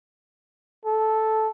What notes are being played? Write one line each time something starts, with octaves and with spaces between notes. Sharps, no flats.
A4